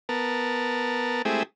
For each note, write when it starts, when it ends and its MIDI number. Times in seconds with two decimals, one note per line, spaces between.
0.09 1.22 59
0.09 1.22 70
0.09 1.22 81
1.25 1.43 56
1.25 1.43 57
1.25 1.43 60
1.25 1.43 64
1.25 1.43 67
1.25 1.43 68